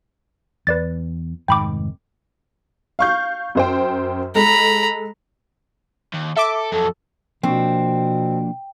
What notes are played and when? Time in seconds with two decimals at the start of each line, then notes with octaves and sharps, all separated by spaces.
0.67 E2 B4 D5 A6
1.48 F1 G#2 D#3 G5 B5 D6
2.99 F5 C#6 G6
3.55 F#2 C5 G5
4.35 G#3 A4 A#5 B5
6.14 D#2
6.37 A4 E5 D6
6.72 F2 F#3 A4
7.43 B2 F3 A#3 C4 D4